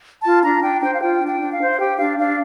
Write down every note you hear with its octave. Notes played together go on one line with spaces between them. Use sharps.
F4 A5
D4 A#5
D4 G5
C5 G5
F5
F4 G5
D4
G5
D4
F5
C5
F5
G4 G5
D4 F5
D4 F5